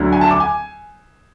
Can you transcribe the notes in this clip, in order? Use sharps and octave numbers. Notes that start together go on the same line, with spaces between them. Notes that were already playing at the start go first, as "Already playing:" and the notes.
Already playing: D2 D3 F#3
G#5
A5
D6
G#5